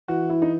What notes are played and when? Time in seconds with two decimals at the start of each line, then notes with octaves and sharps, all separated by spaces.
0.08 E3 F#4
0.29 E4
0.42 D#4